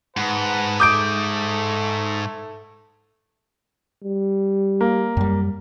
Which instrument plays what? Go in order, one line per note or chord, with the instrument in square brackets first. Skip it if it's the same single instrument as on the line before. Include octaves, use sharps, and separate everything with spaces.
[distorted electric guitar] G#2 [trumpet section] B4 F#5 A5
[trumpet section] A3 A4 [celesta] D6 [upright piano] D#6 G6 D7
[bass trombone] G3
[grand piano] A#3
[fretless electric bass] F#2 G3